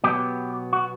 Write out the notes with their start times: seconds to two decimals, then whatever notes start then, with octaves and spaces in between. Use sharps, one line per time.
0.04 B2 F#3 B3 G4
0.73 F#4